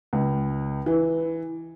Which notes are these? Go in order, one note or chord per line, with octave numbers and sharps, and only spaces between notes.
C#2
E3